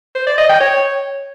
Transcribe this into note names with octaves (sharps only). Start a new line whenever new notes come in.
C5
D5
D#5
G5
C#5